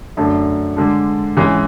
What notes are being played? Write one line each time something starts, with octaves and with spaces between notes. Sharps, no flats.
F#2 D3 A3 D4
D3 G#3 D4
G#2 E3 G#3 C#4